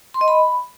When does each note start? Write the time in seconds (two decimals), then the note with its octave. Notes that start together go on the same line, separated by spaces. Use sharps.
0.14 C6
0.21 D#5
0.28 B5